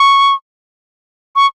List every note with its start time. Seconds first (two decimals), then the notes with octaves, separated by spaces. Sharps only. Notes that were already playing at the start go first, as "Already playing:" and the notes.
Already playing: C#6
1.36 C#6